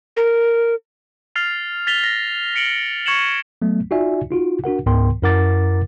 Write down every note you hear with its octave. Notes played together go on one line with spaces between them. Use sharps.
A#4
F6 A6 C7 F7
A6 B6 F7 G7
A#6
B6 C#7 D7 F#7 G7
C#6 G#6 C#7 E7 F#7
F#3 A3 B3
D#4 F4 F#4 D5 E5 G#5
D#4 F4 F#4
D4 F#4 A#4 F#5
C#2 G#2 B3 A#4 G5 C6
F#2 E4 A#4 F#5 D6 A6